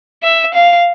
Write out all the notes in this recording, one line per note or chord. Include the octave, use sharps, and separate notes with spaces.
E5
F5